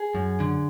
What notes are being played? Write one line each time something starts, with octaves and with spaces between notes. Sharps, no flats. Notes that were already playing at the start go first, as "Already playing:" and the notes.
Already playing: G#4
F#2
D3